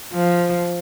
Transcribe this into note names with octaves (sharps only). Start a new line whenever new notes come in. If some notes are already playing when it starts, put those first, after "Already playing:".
F3